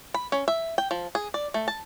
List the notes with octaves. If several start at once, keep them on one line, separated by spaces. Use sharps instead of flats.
B5
C#4
E5
G5
F3
G#4
D5
A3
A5